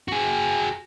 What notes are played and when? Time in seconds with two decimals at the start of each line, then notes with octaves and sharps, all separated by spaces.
0.08 F#4 G#4